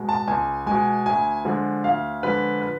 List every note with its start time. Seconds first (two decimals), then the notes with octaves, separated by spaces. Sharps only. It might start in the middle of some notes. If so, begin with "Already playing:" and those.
Already playing: B2 G#3
0.09 A5
0.28 C#2 G#5
0.66 B2 G#3 G#5
1.06 D2 G#5
1.45 D3 F3 G#3
1.84 D2 F5
2.23 D3 F3 G#3 B4
2.62 B4